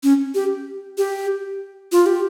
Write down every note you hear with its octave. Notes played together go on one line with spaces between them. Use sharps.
C#4
G4
G4
F4
G4